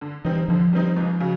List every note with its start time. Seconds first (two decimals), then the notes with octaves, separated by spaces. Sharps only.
0.01 D3
0.24 E3 G3 C4 D#4
0.48 D3 F3
0.73 G3 C4 D#4
0.96 C#2
1.20 C#3 F#3